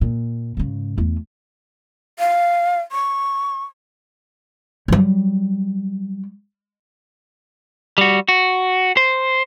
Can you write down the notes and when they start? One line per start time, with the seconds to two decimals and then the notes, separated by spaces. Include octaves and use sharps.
0.01 A#2
0.57 G#2 C#3
0.98 E2 A3
2.19 F5
2.92 C#6
4.88 F#3 G3
7.98 G3 F#4
8.29 F#4
8.97 C5